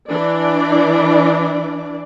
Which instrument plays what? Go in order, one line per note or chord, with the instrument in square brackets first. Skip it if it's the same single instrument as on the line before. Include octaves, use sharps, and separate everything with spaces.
[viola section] E3 D4 D5